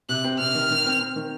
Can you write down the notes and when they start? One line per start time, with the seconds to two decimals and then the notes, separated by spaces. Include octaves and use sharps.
0.09 C3 F#6
0.24 C4
0.39 C3 F6
0.55 D#3
0.71 D#3
0.86 C4
1.01 C4
1.16 D#3